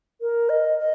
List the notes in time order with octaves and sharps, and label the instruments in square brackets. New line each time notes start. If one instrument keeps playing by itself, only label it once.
[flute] A#4
D#5
D#5